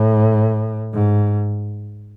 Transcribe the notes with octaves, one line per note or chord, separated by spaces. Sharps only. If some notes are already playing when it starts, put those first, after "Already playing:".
Already playing: A2
G#2